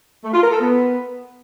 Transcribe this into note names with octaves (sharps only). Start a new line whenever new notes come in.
A3
F4
A#4
A4
B3